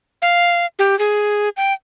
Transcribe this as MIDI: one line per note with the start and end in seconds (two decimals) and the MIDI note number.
0.22 0.66 77
0.79 0.98 67
0.99 1.49 68
1.57 1.73 79